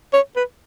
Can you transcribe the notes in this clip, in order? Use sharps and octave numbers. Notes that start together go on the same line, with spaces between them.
C#5
B4